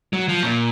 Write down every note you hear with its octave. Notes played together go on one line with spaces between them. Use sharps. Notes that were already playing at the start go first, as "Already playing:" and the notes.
F#3
F3
A#2